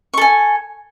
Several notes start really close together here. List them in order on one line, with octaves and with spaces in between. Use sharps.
C#6 A4 G#5